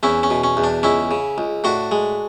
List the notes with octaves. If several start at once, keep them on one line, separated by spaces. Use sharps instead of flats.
E2 C#4 E4
C#4
B2
C#4
E2
D4
C#2 C#4 E4
C#3
C#2
A2 D4 F#4
G#3